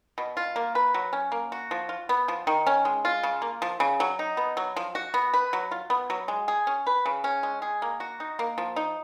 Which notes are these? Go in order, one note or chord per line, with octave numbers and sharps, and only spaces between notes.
B2
F4
A#3
B4
F#3
C#4
A#3
F#4
F3
F4
B3
F3
D#3
C#4
G#3
F4
C#3
A#3
F3
C#3
F#3
D#4
B3
F#3
F3
F#4
B3
B4
F#3
F4
B3
F#3
G#3
G#4
C#4
B4
C#3
C#4
G#3
G#4
A#3
F#4
D#4
A#3
F3
D#4